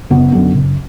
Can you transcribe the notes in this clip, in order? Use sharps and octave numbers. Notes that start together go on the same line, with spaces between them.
F#1 B3
F#2 D3 F#3 B3
F#1